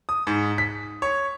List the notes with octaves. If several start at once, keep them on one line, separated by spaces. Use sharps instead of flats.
D#6
G#2
B6
C#5